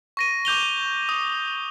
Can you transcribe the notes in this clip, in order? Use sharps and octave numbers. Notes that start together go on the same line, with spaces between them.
C#6 A#6 D#7
D6 G6 F7 G7
D#6